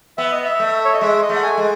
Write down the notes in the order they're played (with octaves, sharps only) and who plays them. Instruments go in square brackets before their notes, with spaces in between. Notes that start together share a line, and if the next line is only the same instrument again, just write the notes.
[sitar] B3 [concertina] E5
[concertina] D#5
E5
[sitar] A3
[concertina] C#5
D#5
[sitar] G#3 [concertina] E5
[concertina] D#5
[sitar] A3
[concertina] F#5
G#5
[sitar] G#3